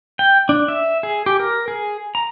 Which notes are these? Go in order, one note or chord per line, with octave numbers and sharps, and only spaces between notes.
G5
D4
E5
G#4
G4
A#4
G#4
A#5